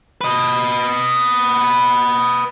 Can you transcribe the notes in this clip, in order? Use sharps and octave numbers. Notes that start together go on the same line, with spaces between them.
B4 D#5